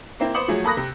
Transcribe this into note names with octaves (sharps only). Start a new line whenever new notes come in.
A#3 C4 E4
B3 C5 D6 D#6 C#7 F#7
F3 F#3 A3 G#4
A#3 A4 B5 D#6 F#6 A#6
C3